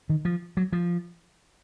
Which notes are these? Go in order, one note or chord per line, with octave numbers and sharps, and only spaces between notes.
D#3
F3
F#3
F3